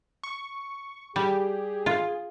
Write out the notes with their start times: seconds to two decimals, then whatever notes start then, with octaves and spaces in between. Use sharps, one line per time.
0.24 C#6
1.16 G3 G4 G#4
1.86 F4